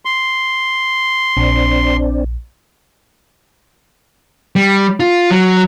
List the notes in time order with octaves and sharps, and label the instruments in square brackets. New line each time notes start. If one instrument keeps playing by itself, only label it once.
[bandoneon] C6
[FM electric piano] A#1 [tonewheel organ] C4 D4
[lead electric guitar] G3
F4
F#3